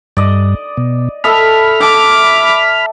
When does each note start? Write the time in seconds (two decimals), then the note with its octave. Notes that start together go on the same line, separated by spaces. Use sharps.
0.17 G2 D5 D#5
0.77 B2
1.24 A4 D#5 E5 B5 F6
1.81 E5 A5 D6